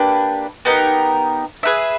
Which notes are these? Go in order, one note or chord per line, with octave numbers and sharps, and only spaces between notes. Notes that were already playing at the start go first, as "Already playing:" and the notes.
Already playing: A#3 D4 G4 B4
B3 D#4 G4 A#4
G#4 B4 E5